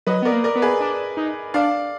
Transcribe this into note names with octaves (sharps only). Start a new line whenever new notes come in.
F#3 B4 D#5
B3 A#4 D5
A#3
A#4 D5
B3
G#4 B4
D4
D#4
D4 D5 F5